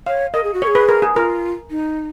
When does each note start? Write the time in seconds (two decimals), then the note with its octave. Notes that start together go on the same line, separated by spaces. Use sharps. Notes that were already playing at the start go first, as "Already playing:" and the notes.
0.06 C#5 F5
0.34 A#4 D#5
0.44 G#4
0.54 F#4
0.62 A#4 C#5
0.67 G#4
0.75 B4
0.89 A#4
1.02 G#4
1.15 F4 A#4
1.70 D#4